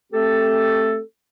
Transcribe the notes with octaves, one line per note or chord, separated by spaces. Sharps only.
A3 C4 G4 A4